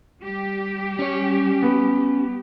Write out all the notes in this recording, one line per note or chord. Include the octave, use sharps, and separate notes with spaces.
G3 G4
C#4 C#5
B3